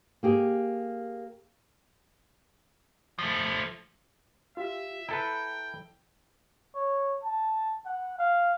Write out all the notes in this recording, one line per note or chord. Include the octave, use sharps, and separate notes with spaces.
A#3 G4 G#4
F3 A3
F4 G4 E5
E4 A4 B4 G5 A#5
C#5
A5
F#5
F5